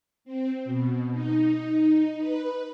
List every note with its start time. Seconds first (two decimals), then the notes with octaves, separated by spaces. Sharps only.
0.25 C4
0.65 B2
1.12 D#4
2.18 B4